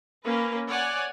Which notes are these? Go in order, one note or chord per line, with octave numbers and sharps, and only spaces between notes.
A#3 C#4 B4
C#5 D5 F#5 G#5